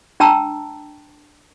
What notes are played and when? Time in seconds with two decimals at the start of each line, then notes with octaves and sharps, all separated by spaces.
0.20 D4 G5 A5 A#5 E6